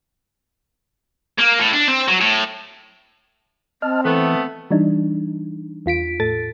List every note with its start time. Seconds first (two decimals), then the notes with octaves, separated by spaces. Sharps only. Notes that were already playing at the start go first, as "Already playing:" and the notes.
1.39 A#3
1.60 A2
1.73 D4
1.88 C4
2.08 F#3
2.21 A2
3.82 C4 D#5 A5 F6
4.05 E3 A3 B3
4.71 E3 G3 D4 D#4
5.86 E2 F4 B6 D7
6.20 A2 A4 A6